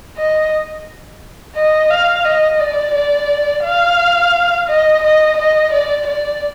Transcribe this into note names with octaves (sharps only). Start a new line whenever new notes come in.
D#5
D#5
F5
D#5
D5
D5
F5
D#5
D#5
D#5
D5
D5